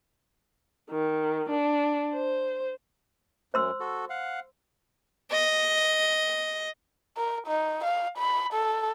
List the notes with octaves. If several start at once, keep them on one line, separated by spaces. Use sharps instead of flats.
D#3
D4
C5
F#2 C5 C6 E6
F#4 A4
F5 F#5
D#5
A#4
D#4
F5
B5
A4